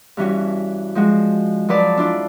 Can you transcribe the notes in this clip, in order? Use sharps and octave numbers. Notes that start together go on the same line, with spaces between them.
G2 E3 C#4 F#4
F3 G#3 F#4
F3 F#3 B4 D5 A5
D4 E4 F4 D5